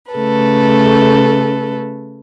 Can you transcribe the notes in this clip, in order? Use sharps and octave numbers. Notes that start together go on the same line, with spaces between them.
C#3 A3 A4 B4